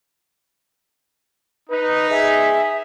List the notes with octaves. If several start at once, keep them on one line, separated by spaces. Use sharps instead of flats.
D#4 B4
G#4 E5